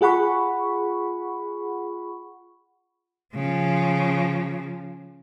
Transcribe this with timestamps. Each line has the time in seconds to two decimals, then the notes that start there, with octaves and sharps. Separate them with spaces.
0.01 F4 G#4 F#5 B5 C#6
3.35 C#3 F3